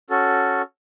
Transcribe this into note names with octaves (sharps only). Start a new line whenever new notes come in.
C#4 F#4 A4